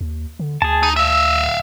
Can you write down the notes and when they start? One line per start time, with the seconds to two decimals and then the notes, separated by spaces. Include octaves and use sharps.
0.01 D#2
0.39 D3
0.62 D2 G#4 A5
0.83 D#4
0.96 E5 F5 E6